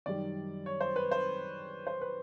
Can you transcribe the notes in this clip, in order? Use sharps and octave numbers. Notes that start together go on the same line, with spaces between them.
F#2 D#3 G3 D5
C#5
C5
B4
C5
C5
B4